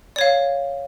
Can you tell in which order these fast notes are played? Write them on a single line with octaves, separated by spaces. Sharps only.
D5 C#5 F5